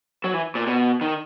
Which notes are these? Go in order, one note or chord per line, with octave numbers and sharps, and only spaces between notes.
F#3
E3
A#2
B2
D#3